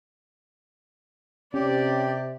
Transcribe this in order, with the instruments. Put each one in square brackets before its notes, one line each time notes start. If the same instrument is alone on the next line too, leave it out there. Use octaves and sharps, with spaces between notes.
[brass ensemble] C3 [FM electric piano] C#4 [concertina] G4 [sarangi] D5